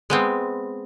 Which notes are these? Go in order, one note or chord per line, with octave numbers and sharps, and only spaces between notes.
G#3 B3 C4